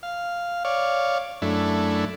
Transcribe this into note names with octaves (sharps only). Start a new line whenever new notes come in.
F5
C#5 D5 F5
F#2 A3 D4 E4